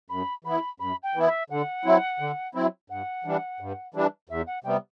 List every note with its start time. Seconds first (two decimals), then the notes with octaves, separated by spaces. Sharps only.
0.10 F#2 B5
0.44 E3 B3 E4 B5
0.80 F#2 B5
1.03 G5
1.15 E3 B3 E4
1.27 E5
1.50 D3 F#5
1.85 F#3 C4 E4
2.20 D3
2.55 F#3 C4 E4
2.90 G2 F#5
3.24 E3 G3 D4
3.60 G2
3.94 E3 G3 D4
4.29 E2 E5
4.47 F#5
4.64 C3 G3 B3 G5